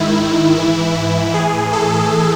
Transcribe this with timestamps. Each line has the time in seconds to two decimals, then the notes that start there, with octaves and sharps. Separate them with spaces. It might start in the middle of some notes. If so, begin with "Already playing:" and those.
Already playing: G#2 D#3 E4
0.57 G#2 E3
0.96 E4
1.34 A2 E3 G#4
1.73 A4